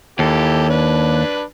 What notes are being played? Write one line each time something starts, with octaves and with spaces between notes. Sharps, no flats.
D#2 E3 G4 A4
D4 B4